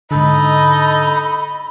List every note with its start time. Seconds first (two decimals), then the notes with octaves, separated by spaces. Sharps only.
0.11 G#2 D3 D#4 A4 D#5 B5